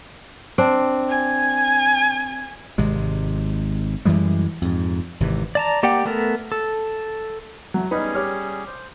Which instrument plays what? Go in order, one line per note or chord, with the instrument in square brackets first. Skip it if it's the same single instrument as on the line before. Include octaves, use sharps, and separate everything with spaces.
[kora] C4 D4
[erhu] G#5
[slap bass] G#1 C3 G#3
F#2 E3 G3 G#3
F2 G#2
G#1 C3 E3
[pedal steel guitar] D5 A5 A#5
A#3 G4 D5 F#5 G5
A3 B3 A4 A#4
A4
[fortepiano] F#3 [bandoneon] A3
[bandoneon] G3 C#4 G#4 [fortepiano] B3 D#4 B4
[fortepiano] G4 C#5 F6
[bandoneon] C5